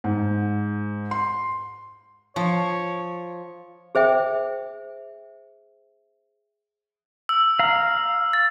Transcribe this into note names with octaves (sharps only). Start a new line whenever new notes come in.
G#2
C6
F3 C#5
G#4 C5 E5 G5
E6
F5 A#5
A6